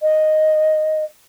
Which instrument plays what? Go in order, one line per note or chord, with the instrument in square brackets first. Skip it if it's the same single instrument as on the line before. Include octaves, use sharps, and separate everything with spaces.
[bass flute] D#5